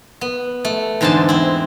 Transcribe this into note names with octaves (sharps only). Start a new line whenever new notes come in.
B3
A3
E2 G#2 D3 C5 A5
C4 E4